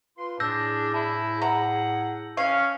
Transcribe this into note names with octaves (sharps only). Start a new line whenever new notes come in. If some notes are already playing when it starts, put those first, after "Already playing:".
F4 B4 C6
A2 D4 G#4 E6 G6 A#6
E4 A5
F#5 A#5
C#4 F5